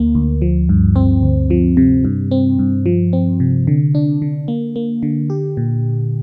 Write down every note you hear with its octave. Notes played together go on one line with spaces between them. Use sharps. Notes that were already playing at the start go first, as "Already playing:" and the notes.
Already playing: D2 A#3
D2
F3
G2
C4
D2
F3
C3
G2
C4
G2
F3
C4
C3
D3
D4
D3
A#3
A#3
D3
G4
A#2